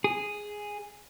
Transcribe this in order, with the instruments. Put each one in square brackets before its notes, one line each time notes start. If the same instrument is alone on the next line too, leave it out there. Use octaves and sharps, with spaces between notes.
[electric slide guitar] G#4